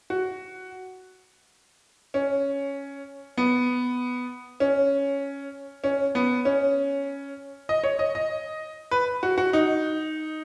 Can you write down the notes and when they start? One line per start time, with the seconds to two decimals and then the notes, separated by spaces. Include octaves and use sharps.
0.10 F#4
2.14 C#4
3.38 B3
4.60 C#4
5.84 C#4
6.15 B3
6.45 C#4
7.69 D#5
7.84 C#5
7.99 D#5
8.15 D#5
8.91 B4
9.23 F#4
9.38 F#4
9.53 D#4